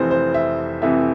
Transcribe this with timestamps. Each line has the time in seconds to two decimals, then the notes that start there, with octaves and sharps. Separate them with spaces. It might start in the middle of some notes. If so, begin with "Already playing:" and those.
Already playing: F1 F2 E3 C5
0.11 C5
0.34 E5
0.82 F1 F2 E3 E5